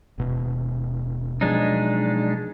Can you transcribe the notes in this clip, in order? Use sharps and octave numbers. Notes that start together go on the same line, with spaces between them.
D#1 B2
B2 F3 F#3 G#3 D4 D#4